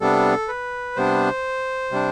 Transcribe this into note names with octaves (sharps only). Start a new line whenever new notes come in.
C3 G3 B3 D4 A4
B4
C3 G3 B3 D4 C5
C3 G3 D4